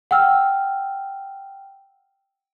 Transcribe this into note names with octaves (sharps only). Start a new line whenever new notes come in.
F#5 G5 E6 F6